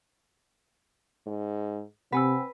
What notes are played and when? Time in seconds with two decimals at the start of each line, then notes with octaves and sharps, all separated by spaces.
1.26 G#2
2.12 C3 C4 B4 F#5 G#5 E6